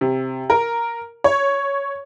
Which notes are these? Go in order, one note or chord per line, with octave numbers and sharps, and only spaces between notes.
C3
A#4
C#5